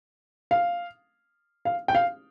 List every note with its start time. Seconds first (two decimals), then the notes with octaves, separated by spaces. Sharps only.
0.51 F5
1.65 F5
1.88 G5
1.95 F5